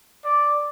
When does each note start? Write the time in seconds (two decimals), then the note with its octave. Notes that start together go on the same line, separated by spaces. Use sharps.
0.24 D5